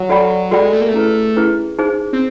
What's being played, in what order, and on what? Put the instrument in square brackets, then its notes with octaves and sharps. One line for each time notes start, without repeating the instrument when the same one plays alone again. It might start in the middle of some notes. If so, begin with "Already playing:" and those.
Already playing: [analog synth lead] F#3
[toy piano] F#4 A4 D5 G5 B5
[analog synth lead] G#3 [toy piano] F#4 A4 D5 G5 B5
[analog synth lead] A3
A#3
A3
[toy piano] C#4 E4 G#4 B4
C#4 E4 G#4 B4
D#4 G#4 C5
[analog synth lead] C4